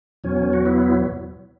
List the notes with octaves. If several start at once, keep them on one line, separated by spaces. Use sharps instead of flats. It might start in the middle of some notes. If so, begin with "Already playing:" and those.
E2 B2 F#3 C#4
F#4
B3 E4